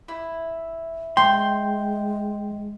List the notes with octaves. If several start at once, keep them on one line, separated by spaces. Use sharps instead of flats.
E4
G#3 G5 C6